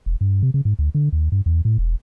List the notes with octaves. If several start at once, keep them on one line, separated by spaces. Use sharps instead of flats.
E1
G2
C3
C#3
G#2
D2
D3
D#2
G2
E2
A2
E1